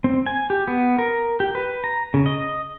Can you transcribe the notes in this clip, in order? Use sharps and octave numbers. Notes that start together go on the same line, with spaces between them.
C4
G#5
G4
B3
A#4
G4
B4
A#5
C#3
D#5